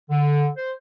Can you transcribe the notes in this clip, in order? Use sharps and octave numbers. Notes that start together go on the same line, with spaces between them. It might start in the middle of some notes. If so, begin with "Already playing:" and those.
D3
C5